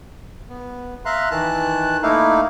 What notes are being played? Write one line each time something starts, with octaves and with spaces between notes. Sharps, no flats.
B3
E5 F5 A#5 C6 F#6
D#3 E3 A5 F#6
A3 A#3 D#4 E4 F5